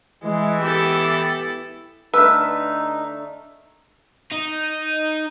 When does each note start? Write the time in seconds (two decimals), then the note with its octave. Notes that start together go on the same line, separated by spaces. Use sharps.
0.24 E3 G#3
0.62 B3 E4 G4 A4
2.14 D3 A3 D#4 B4 E5 E6 F6
4.32 D#4